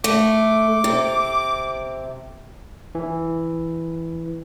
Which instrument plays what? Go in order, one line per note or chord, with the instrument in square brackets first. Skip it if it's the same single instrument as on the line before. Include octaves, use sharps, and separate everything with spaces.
[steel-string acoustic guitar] A3 [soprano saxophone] D6
[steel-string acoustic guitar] C3
[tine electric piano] E3